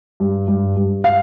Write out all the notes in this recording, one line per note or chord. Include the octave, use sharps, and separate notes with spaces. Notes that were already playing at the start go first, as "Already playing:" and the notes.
G2
G2
G2
F5